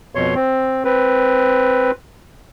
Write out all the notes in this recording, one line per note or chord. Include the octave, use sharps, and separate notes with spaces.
F2 B2 C#5 C6
C4
C4 B4